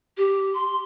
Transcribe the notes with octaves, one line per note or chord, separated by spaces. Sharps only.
G4
C6